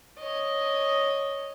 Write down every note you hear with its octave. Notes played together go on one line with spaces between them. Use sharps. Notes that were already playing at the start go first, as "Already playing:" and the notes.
C#5 D#5